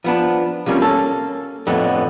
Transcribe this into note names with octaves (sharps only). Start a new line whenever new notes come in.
F3 B3 D4
C3 F3 G3 A#3 C4 C#4
A#3 C#4 A4
F2 A2 D3 A3 B3